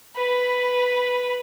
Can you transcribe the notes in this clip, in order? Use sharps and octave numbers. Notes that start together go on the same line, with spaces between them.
B4 B5